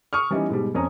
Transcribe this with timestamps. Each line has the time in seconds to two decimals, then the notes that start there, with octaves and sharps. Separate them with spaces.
0.13 C#6 D#6 F6
0.31 E3 G3 B3 C#4 D#4
0.49 G#2 B2 G3
0.75 F2 C#4 C#5 A#5 D#6